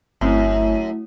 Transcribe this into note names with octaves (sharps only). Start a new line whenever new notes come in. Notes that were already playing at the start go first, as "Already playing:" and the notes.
G1 F#2 A3 C4 E4